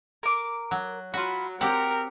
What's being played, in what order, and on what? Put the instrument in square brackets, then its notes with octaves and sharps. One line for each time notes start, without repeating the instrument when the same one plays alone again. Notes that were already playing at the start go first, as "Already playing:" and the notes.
[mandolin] A#4 D6
[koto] F#3
[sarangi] F#3 [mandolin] F4 B5 [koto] F#4
[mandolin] C4 [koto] G4 F#5 [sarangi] A#4